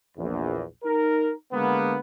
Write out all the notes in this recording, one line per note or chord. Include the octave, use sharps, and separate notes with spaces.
A#1 E2
D#4 A#4
D3 G#3 A#3 B3